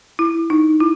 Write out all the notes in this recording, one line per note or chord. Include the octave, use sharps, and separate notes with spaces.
E4
D#4
E4